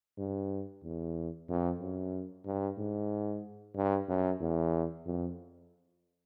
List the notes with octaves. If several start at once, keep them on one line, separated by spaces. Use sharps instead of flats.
G2
E2
F2
F#2
G2
G#2
G2
F#2
E2
F2